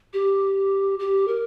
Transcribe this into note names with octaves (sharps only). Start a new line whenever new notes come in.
G4
G4
A#4